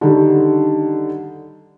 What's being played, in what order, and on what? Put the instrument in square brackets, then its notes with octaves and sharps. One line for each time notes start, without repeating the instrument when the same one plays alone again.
[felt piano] D3 D#3 G3